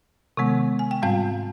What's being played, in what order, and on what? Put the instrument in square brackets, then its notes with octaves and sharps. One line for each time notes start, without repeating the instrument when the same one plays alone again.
[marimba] C3 D#3 G#3 B3
G#5
G5
G#2 G3 C4 F5